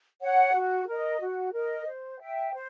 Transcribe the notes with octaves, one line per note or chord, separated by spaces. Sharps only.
C#5 F#5
F#4
A#4 D#5
F#4
A#4 D#5
C5
E5 G5
C5